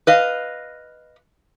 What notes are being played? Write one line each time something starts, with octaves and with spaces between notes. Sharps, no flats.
B4 D#5 F5